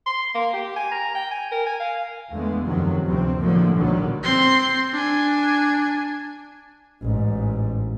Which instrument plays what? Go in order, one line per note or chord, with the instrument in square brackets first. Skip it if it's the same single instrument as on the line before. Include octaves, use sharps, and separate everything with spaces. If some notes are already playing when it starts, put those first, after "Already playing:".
[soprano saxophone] C6
A#3
G4
G#5
A#5
G5
G#5
A#4
G#5
F5
[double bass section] E2 D3 G#3 A3 B3
F#2 C3 D#3 F3 F#3
D2 G2 C3 F3 C4
A2 D3 F3 F#3 A3 A#3
B1 A#2 D3 D#3 F#3 G3
[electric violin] C4 C6
D4 G#5
[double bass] A1 G#2